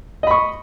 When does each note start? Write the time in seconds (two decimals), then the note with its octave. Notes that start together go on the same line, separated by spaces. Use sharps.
0.23 D#5
0.27 B5
0.31 C#6